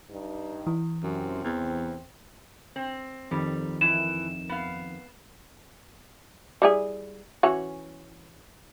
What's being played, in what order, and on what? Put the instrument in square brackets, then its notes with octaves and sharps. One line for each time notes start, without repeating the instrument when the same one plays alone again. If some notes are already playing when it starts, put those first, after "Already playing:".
[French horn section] G2 D#4
[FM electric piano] E3
[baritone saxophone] F#2 [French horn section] C3 C4
[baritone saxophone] E2
[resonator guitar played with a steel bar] C4
[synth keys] F2 D#3 [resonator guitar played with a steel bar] G3
[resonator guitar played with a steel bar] E3 [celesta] E7
[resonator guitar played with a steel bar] B3 F5
[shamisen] G3 E4 G#4
E3 C#4 F#4